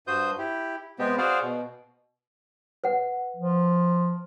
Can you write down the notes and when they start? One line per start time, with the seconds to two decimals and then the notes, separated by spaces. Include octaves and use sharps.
0.07 G2 F#4 C5 D#6 G6
0.38 E4 G4
0.99 C3 G#3 B3 C4 G4
1.18 F#4 G#4 C5 D5 F5 F#5
1.42 B2
2.84 B4 F#5
3.37 F3